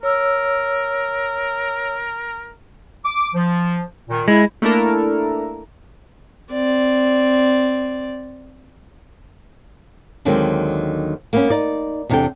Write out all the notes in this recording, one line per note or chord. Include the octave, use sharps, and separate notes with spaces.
A#4 C#5 E6
D6
F3
A#2 D#3
G#3 E4
A3 A#3 D4 E4 A4 A#4
C4 D5
D#2 D3 D#3 F#3 G#3 C4
A#3 B3 C#4
D#4 D5
E2 C3 B3 D4 A4 G5